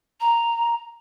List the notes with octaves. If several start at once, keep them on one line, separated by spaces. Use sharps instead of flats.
A#5